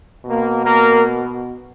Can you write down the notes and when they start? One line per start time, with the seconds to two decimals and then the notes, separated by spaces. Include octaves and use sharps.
0.25 B2 A#3
0.64 A#3 A#4